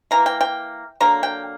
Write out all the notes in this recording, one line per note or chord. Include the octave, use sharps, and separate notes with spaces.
E3 A#3 A#5
G5
G5
D3 F#3 A#3 A#5
G5